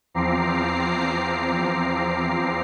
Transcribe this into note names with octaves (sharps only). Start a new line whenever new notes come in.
E2 F3 C4 A#5 D6 C7